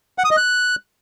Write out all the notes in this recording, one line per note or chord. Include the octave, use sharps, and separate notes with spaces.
F#5
D#6
D#5
F#6